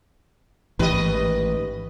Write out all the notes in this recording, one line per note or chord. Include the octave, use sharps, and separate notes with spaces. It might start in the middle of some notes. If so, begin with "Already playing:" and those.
A1 G#2 D#3 E3 G4 B4 D#5